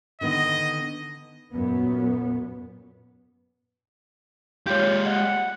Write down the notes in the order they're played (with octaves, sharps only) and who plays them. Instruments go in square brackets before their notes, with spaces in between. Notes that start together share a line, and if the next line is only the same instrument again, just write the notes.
[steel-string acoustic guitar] D3 D#3 B3 [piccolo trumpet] D#5
[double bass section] F#2 A#2 B3
[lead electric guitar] G#3 G4 [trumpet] F4 [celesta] C#5 G6
[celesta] D#5 [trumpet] F#5